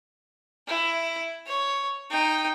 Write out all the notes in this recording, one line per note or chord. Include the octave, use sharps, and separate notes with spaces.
E4
C#5
D#4 G5